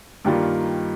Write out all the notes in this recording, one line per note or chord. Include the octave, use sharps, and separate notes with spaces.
G2 D#3 G3 A#3 F4